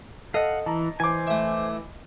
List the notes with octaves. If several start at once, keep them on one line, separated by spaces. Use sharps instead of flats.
A4 D#5 F5 F#5
E3 A5 A#5
E3 C5 G#5 D6
A3 E5